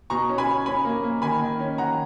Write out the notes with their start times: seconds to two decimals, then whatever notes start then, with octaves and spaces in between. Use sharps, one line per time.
0.10 B2 A#5 C#6
0.29 C#4
0.38 G#5 B5
0.48 C#4
0.66 C#4 G#5 B5
0.85 A#3
1.04 A#3
1.22 D#3 G#5 B5
1.42 D#3
1.59 C#4
1.78 D#3 F#5 A#5